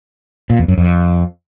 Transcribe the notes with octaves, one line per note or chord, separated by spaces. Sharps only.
A#2
E2
F#2
F2